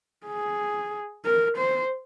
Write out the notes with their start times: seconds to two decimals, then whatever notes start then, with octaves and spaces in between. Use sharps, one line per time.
0.26 G#4
1.25 A#4
1.58 C5